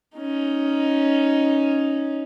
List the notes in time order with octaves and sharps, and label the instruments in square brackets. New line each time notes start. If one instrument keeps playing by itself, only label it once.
[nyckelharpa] C#4 D#4